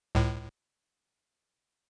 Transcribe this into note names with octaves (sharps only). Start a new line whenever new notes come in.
C#2 A2